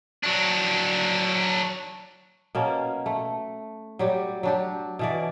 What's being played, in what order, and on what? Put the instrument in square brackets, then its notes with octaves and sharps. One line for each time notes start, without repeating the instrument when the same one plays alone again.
[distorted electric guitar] F#3 D4
[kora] B2 A#3 C#4
A3
F#3 G3 G4
F#3 D4 G4
B2 E3 D5